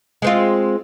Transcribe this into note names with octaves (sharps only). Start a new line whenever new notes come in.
G#3 C4 F4